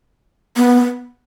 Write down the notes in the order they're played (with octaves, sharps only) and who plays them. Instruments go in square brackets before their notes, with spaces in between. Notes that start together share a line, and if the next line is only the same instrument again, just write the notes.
[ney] B3